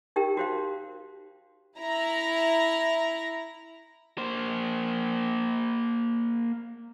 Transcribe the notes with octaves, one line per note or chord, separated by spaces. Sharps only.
D#4 G4 A#4 G5
F#4 C5 F5
E4 A#5
A#3 C5